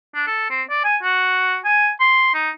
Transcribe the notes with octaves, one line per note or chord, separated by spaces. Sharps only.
D4
A4
C4
D5
G#5
F#4
G#5
C6
D#4